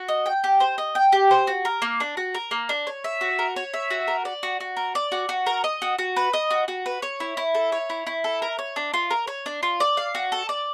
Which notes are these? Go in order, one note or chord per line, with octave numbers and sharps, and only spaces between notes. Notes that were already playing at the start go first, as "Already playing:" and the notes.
Already playing: F#4
D#5
G5
G4
C5
D#5
G5
G4
C5
F#4
A#4
A#3
D4
F#4
A#4
A#3
D4
C#5
E5
F#4
A#4
C#5
E5
F#4
A#4
D5
F#4
F#4
A#4
D5
F#4
F#4
A#4
D#5
F#4
F#4
B4
D#5
F#4
F#4
B4
C#5
E4
E4
A4
C#5
E4
E4
A4
A#4
C#5
D4
F4
A#4
C#5
D4
F4
D5
F5
F#4
A4
D5